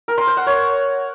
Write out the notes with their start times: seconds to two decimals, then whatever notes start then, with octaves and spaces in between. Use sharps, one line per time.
0.08 A#4
0.18 C6
0.27 C5
0.37 F#5
0.47 C#5